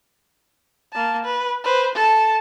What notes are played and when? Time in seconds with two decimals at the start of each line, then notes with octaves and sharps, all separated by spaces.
0.92 A#3 A5
1.25 B4
1.64 B4 C5
1.95 A4 A5